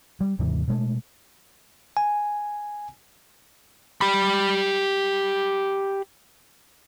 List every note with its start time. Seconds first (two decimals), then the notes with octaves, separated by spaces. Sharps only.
0.21 G3
0.39 D#2 G#2 C3 E3
0.68 B2 G#3 A3
1.97 G#5
4.01 G4 B5